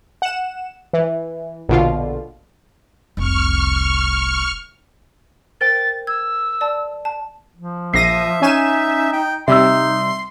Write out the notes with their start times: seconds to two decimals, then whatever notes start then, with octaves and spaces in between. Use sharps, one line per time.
0.22 F#5 E7
0.93 E3
1.69 A#1 B2 D3 F4
3.17 F1 C2 C#6 F6
5.61 A#4 C5 G5 A6
6.07 E6 G#6
6.61 D5 A5
7.05 A5
7.56 F3
7.94 A#1 E5 A#6 C7 D#7
8.42 C#4 D#4 G#5 E7
9.13 G5
9.48 C3 G3 D#4 E5 C6 E6